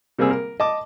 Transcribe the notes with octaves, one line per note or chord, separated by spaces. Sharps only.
C3 G3 A#3 C4 G#4 E6
A#4
D#5 A5 D6